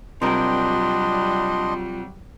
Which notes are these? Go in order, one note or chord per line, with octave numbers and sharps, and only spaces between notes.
C3 F#3 G3 D4 F4 A#4 D#5 C6